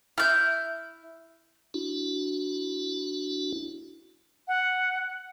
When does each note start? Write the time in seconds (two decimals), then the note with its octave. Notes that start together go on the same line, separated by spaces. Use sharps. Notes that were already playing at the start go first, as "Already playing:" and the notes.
0.18 E4 E5 F6 G6
1.74 D4 E4 F#4
4.48 F#5